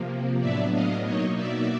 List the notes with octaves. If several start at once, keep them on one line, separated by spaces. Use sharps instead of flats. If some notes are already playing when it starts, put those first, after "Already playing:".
Already playing: C3 F3 A#3
A2 F#3 B3 D4 D5 E5
D#5 F5
B2 F#3 A#3 D#4 C#5 D#5
D5 E5